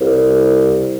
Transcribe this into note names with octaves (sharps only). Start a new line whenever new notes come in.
C2